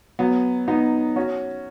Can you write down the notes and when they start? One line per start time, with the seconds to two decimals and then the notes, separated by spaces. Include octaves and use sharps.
0.19 F#3 B3
0.68 B3 D#4
1.16 C#4 F#4